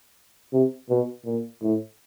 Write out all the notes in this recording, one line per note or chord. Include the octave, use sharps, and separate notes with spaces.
C3
B2
A#2
A2